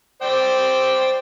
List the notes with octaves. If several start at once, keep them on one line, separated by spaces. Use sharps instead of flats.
C5 D5 G5